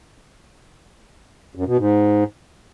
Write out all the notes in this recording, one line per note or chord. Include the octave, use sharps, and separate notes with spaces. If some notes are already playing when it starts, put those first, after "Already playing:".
F#2
B2
G#2